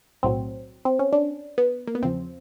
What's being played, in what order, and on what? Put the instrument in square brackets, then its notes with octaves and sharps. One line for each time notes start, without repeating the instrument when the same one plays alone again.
[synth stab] B1 A2 F#3 C4
C4
C#4
D4
B3
A#3
B3
E2 C#3 F3 C4